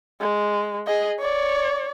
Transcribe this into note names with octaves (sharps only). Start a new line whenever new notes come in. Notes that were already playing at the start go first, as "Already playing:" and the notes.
G#3
G#4 D#5
C#5 D5